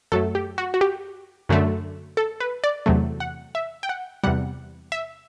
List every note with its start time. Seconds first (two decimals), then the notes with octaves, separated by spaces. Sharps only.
0.12 F#2 F#3 A3 A4
0.35 G4
0.58 F#4
0.74 F#4
0.81 G4
1.49 F#2 D3 F#3 A3
2.17 A4
2.40 B4
2.64 D5
2.86 E2 C3 F#3 A3
3.20 F#5
3.55 E5
3.83 G5
3.89 F#5
4.24 E2 C3 G3 F#5
4.92 E5